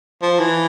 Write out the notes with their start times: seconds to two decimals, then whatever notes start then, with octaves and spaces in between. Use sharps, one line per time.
0.22 F3
0.39 E3